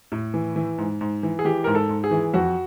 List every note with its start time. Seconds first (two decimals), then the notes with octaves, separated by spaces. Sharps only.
0.12 A2
0.34 E3
0.56 E3
0.78 G#2
1.01 G#2
1.23 E3
1.39 G#4
1.45 E3 G4
1.64 G#2 A#4
1.75 A4
1.89 G#2
2.04 G#4
2.11 E3
2.34 F2 F#4